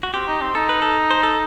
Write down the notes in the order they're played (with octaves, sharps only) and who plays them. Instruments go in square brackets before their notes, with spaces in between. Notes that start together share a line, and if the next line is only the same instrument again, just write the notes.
[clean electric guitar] F#4
[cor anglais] C4 [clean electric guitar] G4
[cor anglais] D#4
C4
[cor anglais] D#4 [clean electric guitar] A4
[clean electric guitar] B4
A4
C5
A4